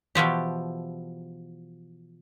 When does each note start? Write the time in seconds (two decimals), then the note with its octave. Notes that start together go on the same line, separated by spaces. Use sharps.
0.15 B2 E3 F3 G4